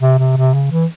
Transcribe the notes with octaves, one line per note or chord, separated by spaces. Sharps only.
C3
C3
C3
C#3
E3